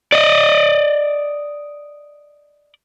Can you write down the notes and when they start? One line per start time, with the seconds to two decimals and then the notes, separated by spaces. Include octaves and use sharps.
0.12 D5 D#5